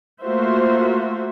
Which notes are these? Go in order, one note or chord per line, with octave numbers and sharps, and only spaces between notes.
A3 A#3 F4 F#4 C5 E5